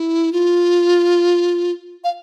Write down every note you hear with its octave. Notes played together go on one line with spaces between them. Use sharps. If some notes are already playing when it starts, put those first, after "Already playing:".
Already playing: E4
F4
F5